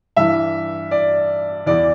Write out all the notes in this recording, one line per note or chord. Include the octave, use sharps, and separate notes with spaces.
G2 E3 E5
D5
E2 E3 D5